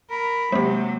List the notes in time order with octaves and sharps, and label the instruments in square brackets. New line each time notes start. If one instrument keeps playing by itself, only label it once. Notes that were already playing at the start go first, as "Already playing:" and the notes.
[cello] A#4 [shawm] B5
[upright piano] C3 C4 [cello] F#3 [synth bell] G#3 A#3